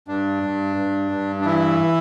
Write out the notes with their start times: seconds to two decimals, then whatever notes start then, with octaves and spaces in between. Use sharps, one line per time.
0.08 G2 D4
0.43 G2
0.77 G2
1.12 G2
1.41 D4
1.45 E3 E4